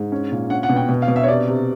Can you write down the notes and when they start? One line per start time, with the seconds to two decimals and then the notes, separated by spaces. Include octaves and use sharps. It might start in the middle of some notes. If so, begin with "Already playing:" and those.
Already playing: G#2
0.12 C#4
0.32 A#2
0.50 C#4 F#5
0.63 F#5
0.69 B2
0.76 G5
0.89 B2
1.02 F5
1.08 B2
1.16 E5
1.23 C#5
1.28 C3 D5
1.48 C3